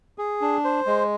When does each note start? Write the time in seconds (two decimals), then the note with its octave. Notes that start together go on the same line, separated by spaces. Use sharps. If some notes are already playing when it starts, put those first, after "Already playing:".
0.18 G#4
0.41 D4
0.64 C5
0.87 G#3